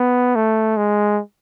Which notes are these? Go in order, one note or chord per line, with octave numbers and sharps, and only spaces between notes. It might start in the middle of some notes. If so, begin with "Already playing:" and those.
Already playing: B3
A3
G#3